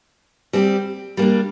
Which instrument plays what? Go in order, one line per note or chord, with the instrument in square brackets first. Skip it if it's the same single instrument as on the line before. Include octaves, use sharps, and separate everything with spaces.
[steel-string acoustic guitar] G3 C4 G4
G3 A#3 D4